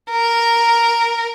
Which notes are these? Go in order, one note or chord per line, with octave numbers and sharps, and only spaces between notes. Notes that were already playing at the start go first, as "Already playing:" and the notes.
A#4